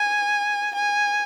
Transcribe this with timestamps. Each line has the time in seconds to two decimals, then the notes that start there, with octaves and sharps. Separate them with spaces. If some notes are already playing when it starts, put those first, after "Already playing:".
Already playing: G#5
0.75 G#5